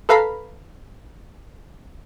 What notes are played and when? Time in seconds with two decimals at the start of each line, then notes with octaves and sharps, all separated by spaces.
0.09 A4 B4 F5 A#5 B5